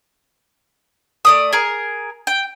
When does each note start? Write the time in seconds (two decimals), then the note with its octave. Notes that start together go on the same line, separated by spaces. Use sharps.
1.25 A3 D5 D#6
1.53 G#4 A#4
2.27 G5